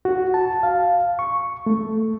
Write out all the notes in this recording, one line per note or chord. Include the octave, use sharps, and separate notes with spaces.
F#4
A5
F5
C#6
A3